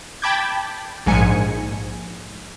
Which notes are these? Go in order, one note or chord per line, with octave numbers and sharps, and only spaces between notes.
G5 A5 B5 D6 G6 G#6
A#1 G#2 G#5 C#7